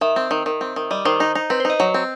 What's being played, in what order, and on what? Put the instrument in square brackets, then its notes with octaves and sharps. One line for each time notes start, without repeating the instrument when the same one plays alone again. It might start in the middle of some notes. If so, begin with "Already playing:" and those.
[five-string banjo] D#3 [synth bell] E5
[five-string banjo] C4
D#3
D#3
C4
D#3
[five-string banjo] G3 [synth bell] D#5
[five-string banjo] D#3 [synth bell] C5
[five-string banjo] D#4
D#4
[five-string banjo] C4 [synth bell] B4
[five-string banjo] D#4 [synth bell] C5
[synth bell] D#5
[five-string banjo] F#3
C4